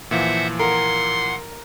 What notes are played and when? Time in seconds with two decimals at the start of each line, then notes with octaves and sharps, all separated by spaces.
0.11 A#2 E3 F3 C5 E5 F#5
0.59 A#4 F#5 C6